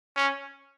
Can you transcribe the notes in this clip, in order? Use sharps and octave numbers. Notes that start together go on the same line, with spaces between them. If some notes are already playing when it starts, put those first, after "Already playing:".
C#4